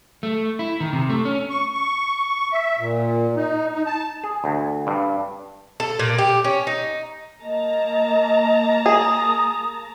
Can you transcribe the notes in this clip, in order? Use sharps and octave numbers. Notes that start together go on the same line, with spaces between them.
A3
E4
D#3
C3
A3
C#4
C#6
C#6
E5
A#2
D#4
D#4
A5
G#4
D2
G2
A4
A#2
G4
C#4
D#4
A#3 D#5 A5 A#5
G#4 D#6